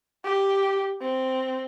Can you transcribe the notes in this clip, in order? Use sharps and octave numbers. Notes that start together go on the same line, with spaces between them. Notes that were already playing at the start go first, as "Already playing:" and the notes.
G4
C4